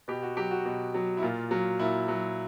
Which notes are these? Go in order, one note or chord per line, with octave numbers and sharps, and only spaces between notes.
B2 G4
F#4
F#3 G4
F#4
B2
F#3
E4
A#2 F4
F#3
A#2 E4
F#3